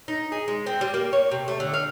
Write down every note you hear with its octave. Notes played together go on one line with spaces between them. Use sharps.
D#4
G#4
G#3
C4
G3
A#3
C#5
C3
A3
D3
F5